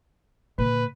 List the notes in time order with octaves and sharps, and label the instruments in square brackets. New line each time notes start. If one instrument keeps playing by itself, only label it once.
[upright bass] A#2 D3 [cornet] B4